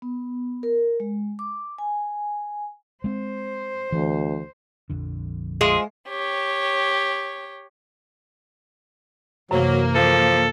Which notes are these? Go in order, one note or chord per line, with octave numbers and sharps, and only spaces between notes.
B3
A#4
G#3
D6
G#5
G#3 C4 C5
D2 E3
A#1 F2 D3
G#3 F4 G#4 C5 D6
G4 C#5
F#2 C3 E3 F#3 A#3
F3 A4